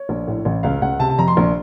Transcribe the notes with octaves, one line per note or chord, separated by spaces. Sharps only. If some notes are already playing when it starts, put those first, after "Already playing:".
Already playing: C#5
A#1
A2
A1
C#2 F5
C#2 F#5
C3 A5
A5
F2 A#5
C6
A#1